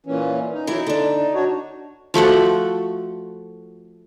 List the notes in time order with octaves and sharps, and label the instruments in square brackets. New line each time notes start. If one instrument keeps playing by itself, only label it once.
[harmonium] A#2 E3 C#4
D#4
[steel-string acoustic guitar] E3 F#3 E4
D3 D4
[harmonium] D4 F#4 C#5
[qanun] F3 A3 F#4 F#5